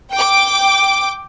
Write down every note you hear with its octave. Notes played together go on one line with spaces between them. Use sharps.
G5 D6